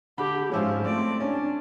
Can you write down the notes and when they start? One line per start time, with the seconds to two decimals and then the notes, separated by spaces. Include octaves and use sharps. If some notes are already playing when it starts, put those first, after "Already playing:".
0.18 D3 G4 B5
0.52 G#2 F3 C#4 E4 F4
0.82 A3 C4 D5
1.20 C#4 D4